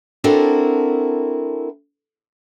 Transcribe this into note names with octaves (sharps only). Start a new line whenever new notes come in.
C4 D4 E4 F#4 A4 A#4